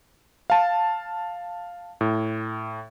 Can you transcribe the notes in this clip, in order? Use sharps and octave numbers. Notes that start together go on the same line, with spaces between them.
F5 A5
A2